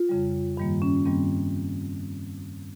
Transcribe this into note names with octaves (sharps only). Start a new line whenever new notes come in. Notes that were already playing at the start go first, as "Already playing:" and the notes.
Already playing: F4
F2 C#3 G3
G2 D#3 G3 A#3
C#4
G2 D#3 G3 A#3 C4